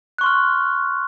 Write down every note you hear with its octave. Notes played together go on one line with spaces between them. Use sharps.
C6 C#6 F6 F#6